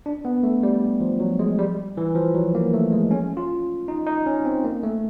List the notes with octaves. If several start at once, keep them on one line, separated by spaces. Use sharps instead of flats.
D4
B3
A3
G3
F3
F#3
G#3
G3
E3
F3
F#3
A#3
A3
G#3
C#4
F4
D#4
D#4
C#4
C4
A#3
A3